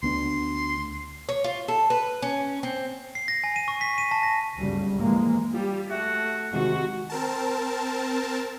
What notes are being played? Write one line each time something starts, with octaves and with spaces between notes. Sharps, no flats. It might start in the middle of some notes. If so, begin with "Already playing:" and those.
D2 B3 D4 C6
C#5
F4
A4
B4
C#4
C4
C7
A#6
G#5
D#7
C#6
B6
D#7
A5
A#6
G1 D2 C#3 G3
A#2 E3 F3 G#3 A#3
G3 F4 G4
A3 F#4 E5
C3 D#3 G#3 F#4
C4 A#4 A5